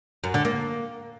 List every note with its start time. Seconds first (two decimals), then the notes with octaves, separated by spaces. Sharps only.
0.24 F#2
0.34 D3
0.45 A#3